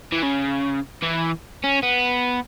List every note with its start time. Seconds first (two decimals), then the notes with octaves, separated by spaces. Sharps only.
0.12 E3
0.23 C#3
1.02 E3
1.64 C#4
1.83 B3